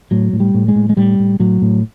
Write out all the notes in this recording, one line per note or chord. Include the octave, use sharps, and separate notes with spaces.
A2 F#3
A2
G3
A2
G#3
A2
G#3
A2 G3
A2
A2 F#3
A2